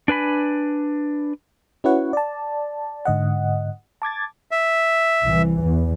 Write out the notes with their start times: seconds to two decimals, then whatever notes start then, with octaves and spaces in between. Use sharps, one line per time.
0.08 D4 B4 G#5 B5
1.84 C#4 E4 F#4 B4 C#5 F#5
2.13 D5 A5
3.05 G#2 D3 D#5 F#5
4.02 A5 D6 G#6 A6
4.51 E5
5.25 C2 E3
5.63 E2